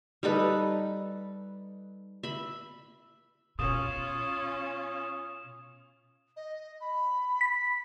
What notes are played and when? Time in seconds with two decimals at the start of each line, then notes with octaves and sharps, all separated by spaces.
0.23 G3 D#4 A4 B4
2.23 E5 B5
3.59 B2 C#4 F4 D#6 E7
6.36 D#5
6.81 B5
7.41 B6